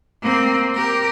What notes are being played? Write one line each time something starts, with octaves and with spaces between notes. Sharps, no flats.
A#3 C4
G4 A#4